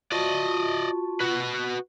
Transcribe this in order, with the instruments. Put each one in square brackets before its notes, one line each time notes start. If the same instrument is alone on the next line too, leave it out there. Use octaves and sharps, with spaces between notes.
[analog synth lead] F4 [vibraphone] F#4 A5 C#6 [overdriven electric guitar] D5 D#5
[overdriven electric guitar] F#4 B4